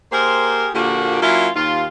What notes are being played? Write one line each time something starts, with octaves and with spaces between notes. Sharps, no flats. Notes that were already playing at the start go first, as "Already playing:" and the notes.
A#3 G4 G#4 A#4 C5
A#2 D3 F3 A#3 F#4 G4
F#3 A#3 C#4 E4 F4
D#2 F4